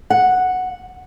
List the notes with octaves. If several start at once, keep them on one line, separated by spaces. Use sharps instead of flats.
F#5